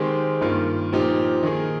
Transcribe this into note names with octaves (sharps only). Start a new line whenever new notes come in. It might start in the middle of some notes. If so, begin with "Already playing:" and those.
Already playing: D#3 G#3 C4 G4
G2 D#3 A#3 F4
A#2 F3 C4 D#4 G4
D#3 A#3 D#4 G#4